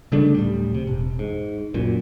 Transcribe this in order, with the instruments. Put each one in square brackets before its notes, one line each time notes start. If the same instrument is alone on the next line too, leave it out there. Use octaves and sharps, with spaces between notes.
[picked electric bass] C#3 G3 A3 D4
D1 A2 G3
C3
E1
G#2
F#2 A#2